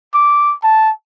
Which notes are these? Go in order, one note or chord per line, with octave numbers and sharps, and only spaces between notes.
D6
A5